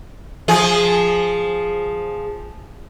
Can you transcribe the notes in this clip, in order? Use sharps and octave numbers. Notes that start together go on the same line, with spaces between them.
F3 G#4